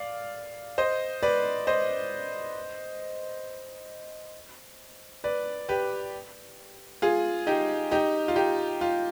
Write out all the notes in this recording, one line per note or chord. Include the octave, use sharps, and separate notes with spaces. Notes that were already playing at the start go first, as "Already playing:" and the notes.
Already playing: D5 F5
C5 D#5
B4 D5
C5 D#5
B4 D5
G4 B4
F4 G#4
D#4 G4
D#4 G4
F4
D#4 G4
F4